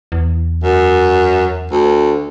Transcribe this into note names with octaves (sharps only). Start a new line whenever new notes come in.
E2
F#2
D2